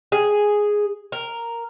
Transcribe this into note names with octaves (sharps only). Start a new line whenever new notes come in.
G#4
A#4